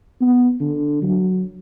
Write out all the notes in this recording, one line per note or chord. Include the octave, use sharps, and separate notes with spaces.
B3
D3
F#3